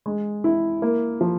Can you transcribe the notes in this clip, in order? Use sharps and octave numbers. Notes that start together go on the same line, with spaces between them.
G#3
E4
A#3
F3